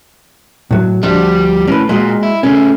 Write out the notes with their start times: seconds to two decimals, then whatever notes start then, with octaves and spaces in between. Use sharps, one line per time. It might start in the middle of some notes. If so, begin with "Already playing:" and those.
0.71 A2 F#3
1.03 D2 F3 G3 D4
1.67 A2 C#4 B4
1.89 A#2 G#3 F#4 D#5
2.23 E4
2.43 C#3 A3 C#4